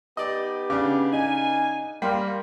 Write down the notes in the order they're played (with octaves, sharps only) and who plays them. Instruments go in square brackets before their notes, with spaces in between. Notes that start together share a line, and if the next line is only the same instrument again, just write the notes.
[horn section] B3 D#4 G4 [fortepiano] D5 D#5
[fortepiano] C#3 D4 [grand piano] D6
[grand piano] D#4 [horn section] G#5
[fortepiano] G3 [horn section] A#3 [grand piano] G5 C6 F6